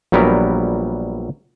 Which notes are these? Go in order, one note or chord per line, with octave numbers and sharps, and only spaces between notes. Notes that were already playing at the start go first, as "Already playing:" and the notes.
A#1 F#3 G3 B3 A#4